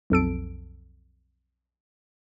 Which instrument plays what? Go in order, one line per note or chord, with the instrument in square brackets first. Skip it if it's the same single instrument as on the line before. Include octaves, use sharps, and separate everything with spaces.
[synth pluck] B1 F2 A4 D7